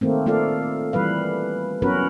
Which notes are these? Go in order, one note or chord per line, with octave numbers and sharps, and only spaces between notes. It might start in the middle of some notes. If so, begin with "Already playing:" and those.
D#3 A3 A#3 C4
A3 A#3 F4 A4 D5 F5
E3 G3 B4 F5
F#3 B3 C#4 F#4 A#4 B4